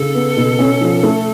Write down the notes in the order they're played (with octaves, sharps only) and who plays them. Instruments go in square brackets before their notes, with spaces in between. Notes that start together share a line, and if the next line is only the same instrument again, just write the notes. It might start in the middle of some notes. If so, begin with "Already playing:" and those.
Already playing: [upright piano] C#3 [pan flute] A4
[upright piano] B3
B2
C#4
F3
A3